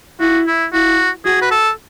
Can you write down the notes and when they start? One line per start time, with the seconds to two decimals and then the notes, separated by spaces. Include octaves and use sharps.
0.20 E4 F#4
0.47 E4
0.73 E4 F#4
1.25 F#4 G#4
1.42 B4
1.51 A4